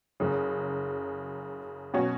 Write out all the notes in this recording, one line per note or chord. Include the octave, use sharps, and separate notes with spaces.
F#1 F#2 C#3
B2 F#3 C#4 F#4